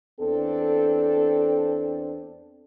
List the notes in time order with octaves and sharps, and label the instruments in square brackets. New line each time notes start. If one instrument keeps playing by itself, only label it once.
[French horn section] E2 C4 D4 A4